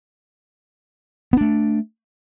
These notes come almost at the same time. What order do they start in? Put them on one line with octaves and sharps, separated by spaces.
B3 D4 A3